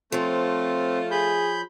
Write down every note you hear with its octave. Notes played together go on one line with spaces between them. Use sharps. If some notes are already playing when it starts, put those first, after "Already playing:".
F3 A3 C4 C#4 F4
G#4 B5 G6